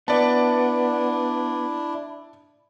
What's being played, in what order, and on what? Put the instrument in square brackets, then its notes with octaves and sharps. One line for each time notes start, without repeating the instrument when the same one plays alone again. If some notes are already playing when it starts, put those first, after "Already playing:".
[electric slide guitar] B3 [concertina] D4 E4 [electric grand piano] D5 A5